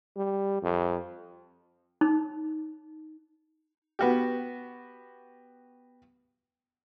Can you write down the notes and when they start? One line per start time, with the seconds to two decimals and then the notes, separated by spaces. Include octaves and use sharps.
0.16 G3
0.62 F2
2.01 D#4
3.99 B3 F#4 G4